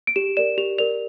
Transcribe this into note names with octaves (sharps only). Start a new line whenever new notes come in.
D7
G4 E7
A#4 D5 E7
G4 F7
A#4 D5 F7